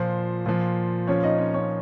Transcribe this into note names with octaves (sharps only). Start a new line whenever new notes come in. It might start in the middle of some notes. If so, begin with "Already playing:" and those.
Already playing: A#2 F3 C5
A#2 F3
A#2 F3 C#4 C#5
D#4 D#5
C#4 C#5
C#4 C#5